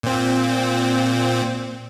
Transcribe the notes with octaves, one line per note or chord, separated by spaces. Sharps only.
A#2 C4